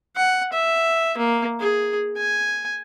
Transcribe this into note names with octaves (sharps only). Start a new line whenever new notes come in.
F#5
E5
A#3
G#4
G#5